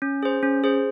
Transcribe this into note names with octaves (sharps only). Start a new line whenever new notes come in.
C#4
G#4 C5
C#4
G#4 C5